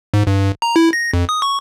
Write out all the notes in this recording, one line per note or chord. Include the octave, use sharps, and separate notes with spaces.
G#2
G2
A#5
E4
A#6
F2
D#6
C#6